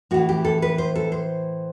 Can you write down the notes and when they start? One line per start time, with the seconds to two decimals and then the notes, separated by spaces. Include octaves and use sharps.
0.11 A2 E3 F#4
0.29 G4
0.45 A4
0.62 B4
0.78 C5
0.95 A4
1.12 C5